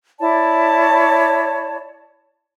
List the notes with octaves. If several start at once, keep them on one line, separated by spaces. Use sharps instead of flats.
E4 C#5 D5 A5